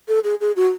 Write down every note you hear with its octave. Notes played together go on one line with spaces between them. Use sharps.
A4
G#4
G#4
F#4